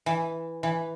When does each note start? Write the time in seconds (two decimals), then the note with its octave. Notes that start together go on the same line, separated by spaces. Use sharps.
0.06 E3
0.63 E3